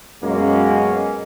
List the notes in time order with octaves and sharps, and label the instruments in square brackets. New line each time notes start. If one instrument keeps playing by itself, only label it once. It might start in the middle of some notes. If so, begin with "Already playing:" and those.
[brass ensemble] F#2 B2 G#3 A#3 C#4